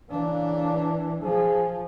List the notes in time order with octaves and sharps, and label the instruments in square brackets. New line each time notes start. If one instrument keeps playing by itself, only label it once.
[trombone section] C#3 A#3 [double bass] E3 D4
[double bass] F3 [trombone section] G#4